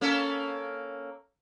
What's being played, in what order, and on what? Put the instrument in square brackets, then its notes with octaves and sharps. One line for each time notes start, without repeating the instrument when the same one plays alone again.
[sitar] A#3 C#4 A4